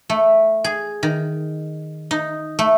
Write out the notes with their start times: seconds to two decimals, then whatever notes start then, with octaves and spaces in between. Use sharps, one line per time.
0.10 A3
0.64 G#4
1.03 D#3
2.11 D#4
2.59 A3